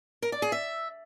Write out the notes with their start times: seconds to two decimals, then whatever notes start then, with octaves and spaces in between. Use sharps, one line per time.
0.22 A#4
0.32 D5
0.42 G#4
0.52 E5